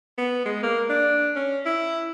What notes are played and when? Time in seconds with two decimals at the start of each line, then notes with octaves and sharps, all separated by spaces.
0.18 B3
0.45 G#3
0.63 A#3
0.89 D4
1.36 C#4
1.66 E4